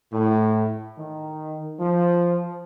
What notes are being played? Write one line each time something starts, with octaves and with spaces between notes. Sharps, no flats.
A2
D#3
F3